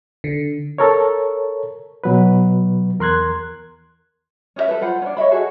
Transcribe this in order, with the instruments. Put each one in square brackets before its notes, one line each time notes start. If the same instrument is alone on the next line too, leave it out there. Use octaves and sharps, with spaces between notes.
[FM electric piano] D3
[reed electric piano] A4 A#4 C#5
B2 F#3 B4
E2 A#4 C6 F#6 G#6
[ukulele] C#4 G#4 E5
A4 B4
F4 C5 F#5 B5
C#4 D4
C#5 D#5 E5 B5
F#4 G#4 A4